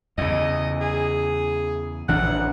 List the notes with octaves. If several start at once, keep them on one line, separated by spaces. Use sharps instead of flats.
E2 C#3 D#5
G#4
A1 E3 D4 F#5